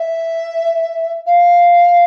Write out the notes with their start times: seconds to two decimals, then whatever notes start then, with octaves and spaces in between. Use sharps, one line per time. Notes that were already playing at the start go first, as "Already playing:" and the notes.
Already playing: E5
1.26 F5